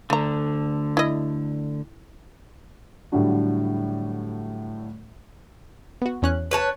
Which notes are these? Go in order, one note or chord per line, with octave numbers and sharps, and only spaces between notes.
D2 D3 A3 A#5
E4 D#5
A2 D3 F#3 G3 D4 F#4
B3 F#4
E2 C#4 F#6
B4 C#5 A5